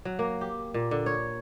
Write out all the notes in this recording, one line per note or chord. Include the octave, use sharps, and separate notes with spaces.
F#3
A#3
G4
A#2
D3
C#5